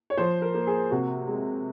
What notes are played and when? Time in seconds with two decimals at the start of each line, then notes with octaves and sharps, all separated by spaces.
0.10 C#5
0.17 F3 C5
0.42 A#4
0.54 A#3
0.67 G#4
0.91 C3 F#4
1.28 G#3